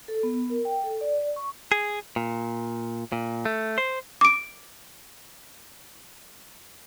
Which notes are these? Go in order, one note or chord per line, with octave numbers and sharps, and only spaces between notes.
A4
B3
A#4
G5
A4
D5
C#6
G#4
A#2
A#2
A3
C5
D6 D7